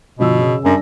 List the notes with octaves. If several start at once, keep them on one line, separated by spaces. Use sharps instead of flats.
G1 B2 F3 E6
C#3
F#2 G3 D4 A#6